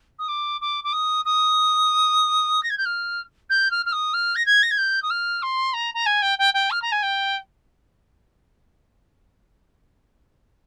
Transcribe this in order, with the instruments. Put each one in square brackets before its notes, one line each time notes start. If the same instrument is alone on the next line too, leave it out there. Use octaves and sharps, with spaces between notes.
[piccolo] D#6
D6
D6
D6
D#6
D#6
A#6
G#6
G6
F6
G6
F6
F6
D#6
F6
A#6
G#6
A#6
G#6
G6
D#6
F6
C6
A#5
A#5
G#5
G5
G5
G5
F6
A#5
G#5
G5